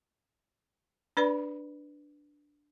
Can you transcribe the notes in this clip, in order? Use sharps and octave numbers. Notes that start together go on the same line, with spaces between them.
D4 B4 D5 B5